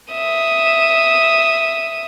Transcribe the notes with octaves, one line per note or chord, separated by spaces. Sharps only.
E5 D#6